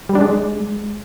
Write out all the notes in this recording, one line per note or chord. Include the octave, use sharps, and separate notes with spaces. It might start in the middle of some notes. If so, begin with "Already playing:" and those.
G3
D4
G#3